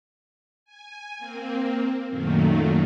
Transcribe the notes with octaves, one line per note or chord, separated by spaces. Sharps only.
G#5
A#3 C4
F#2 A#2 D#3 F#3 A3 A#3